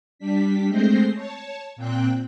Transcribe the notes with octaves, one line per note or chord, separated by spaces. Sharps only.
G3 D4 B6
G#3 A3 C4 G6 A#6 C7
C#5 A5
A#2 C4 G5 F#6